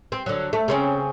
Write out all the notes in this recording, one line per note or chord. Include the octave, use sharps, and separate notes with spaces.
C4
D3 F#3
A3
C#3 C4 C#4